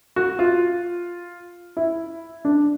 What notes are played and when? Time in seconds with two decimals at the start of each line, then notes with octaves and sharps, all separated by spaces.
0.16 F#4
0.39 F4
1.77 E4
2.45 D4